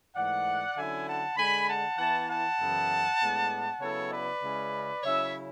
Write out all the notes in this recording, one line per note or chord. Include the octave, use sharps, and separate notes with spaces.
G#2 E3 A3 D5 F#5
D3 F#3 C#4 E4 E5 G#5
F#5 A5
D3 G#3 D4 G#5 B5
F#5 A5
E3 B3 E4 F#5 A5
F#5 A5
F#2 C#3 E3 B3 E4
A2 G#3 B3 D4
C#3 F#3 B3 E4 A4 C#5
B4 D5
C#3 G#3 C#4 E4
C#3 F#3 C#4 E4 C#5 E5